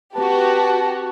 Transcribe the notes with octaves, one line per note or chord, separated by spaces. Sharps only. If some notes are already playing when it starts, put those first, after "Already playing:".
C4 F#4 G4 B4 A5